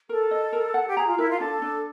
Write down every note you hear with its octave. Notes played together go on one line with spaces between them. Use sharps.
A4 A#4
D#5
A#4
F#5
G4
G#4 A#5
F4
E4 A#4
F4
D4 A4
D4